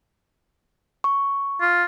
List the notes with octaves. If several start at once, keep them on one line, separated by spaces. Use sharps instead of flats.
C#6
F4